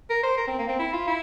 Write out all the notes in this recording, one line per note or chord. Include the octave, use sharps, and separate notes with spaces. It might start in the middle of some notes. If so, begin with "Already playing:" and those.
A#4
C5
A#4
C4
A#3
C4
E4
F4
E4